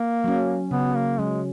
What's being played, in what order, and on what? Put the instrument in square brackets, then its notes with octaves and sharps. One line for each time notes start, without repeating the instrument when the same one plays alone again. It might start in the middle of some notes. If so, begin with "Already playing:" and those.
Already playing: [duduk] A#3
[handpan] F#3 C#4
[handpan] C#3 [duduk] B3
[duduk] A#3
[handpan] F#3 C#4 [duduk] G#3